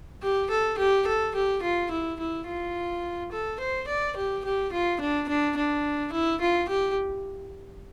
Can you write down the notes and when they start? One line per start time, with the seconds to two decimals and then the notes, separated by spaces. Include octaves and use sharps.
0.22 G4
0.50 A4
0.78 G4
1.07 A4
1.35 G4
1.62 F4
1.91 E4
2.19 E4
2.47 F4
3.32 A4
3.60 C5
3.88 D5
4.16 G4
4.45 G4
4.72 F4
5.00 D4
5.29 D4
5.57 D4
6.12 E4
6.41 F4
6.69 G4